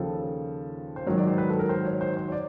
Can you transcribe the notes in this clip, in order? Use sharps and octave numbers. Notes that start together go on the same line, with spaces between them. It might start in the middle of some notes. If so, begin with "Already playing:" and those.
Already playing: D#2 C#3 F3 A4
C5
G#2 D#3 F#3 C#5
D5
C5
B4
A4
A#4
C5
C#5
C5
C5
C#5
D5